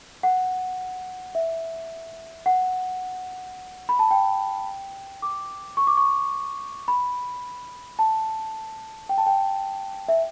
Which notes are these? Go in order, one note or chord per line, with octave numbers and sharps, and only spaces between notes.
F#5
E5
F#5
B5
A5
G5
D6
C#6
D6
C#6
B5
A5
G5
A5
G5
E5